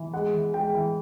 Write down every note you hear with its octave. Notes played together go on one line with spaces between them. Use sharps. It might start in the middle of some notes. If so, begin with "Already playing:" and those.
Already playing: E3
G#3 F#5
E3
G#3 G5
E3